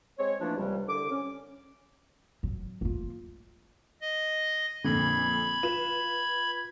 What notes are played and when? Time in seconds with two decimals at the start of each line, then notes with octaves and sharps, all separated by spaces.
0.19 G#3 C4 C#5
0.41 E3 F3 A3 A#3 D4
0.57 C#2 C3 G3
0.88 C2 D3 D6
1.11 C#4
2.43 F#3
2.81 A#3 F4
4.01 D#5
4.84 F2 A#2 D3 B5 G#6
5.63 F4 B4 E7